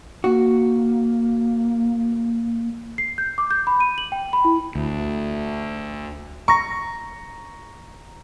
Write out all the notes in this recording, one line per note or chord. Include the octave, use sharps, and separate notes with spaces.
A#3 F#4
C7
G6
D6
G6
B5
D#7
F#7
G5
B5
E4
D2
A#5 C#6 A#6